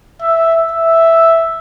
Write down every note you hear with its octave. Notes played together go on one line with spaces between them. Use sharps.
E5
E5